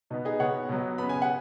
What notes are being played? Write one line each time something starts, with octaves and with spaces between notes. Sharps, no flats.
B2 B3 D#4
D#4 G#4
B2 B3 C#5 F#5
B2 F#3 B3
C#3 B3 B5
G#5
F#5